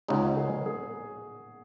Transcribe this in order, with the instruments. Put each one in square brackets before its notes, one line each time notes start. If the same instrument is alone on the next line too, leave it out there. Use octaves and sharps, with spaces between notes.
[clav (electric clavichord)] C#2 C#3 G#3 D#4 [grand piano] F#4
[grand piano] G#4
G#4